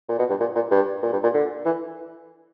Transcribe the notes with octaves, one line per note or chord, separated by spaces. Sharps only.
A#2
B2
G2
A#2
A#2
G2
A#2
G2
A#2
D3
E3